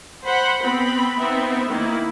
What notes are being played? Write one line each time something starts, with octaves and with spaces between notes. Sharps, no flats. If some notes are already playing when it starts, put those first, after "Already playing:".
C5 F#5 B5
B3 C4 B5
B3 C4 D#4 E5
D#3 A#3 E4